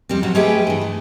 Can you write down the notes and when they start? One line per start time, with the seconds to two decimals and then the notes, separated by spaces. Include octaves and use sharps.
0.09 F2 G3 C4
0.23 F2 F#3 F#4
0.35 G#3 A3 G4 G#4 B4 G5
0.67 G2 E3
0.81 A3